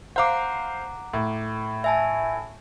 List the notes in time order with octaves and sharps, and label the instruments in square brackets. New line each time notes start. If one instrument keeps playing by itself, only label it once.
[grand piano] C5 F5 [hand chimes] F#5 A#5 D6
[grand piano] A2
[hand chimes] E5 G#5 A5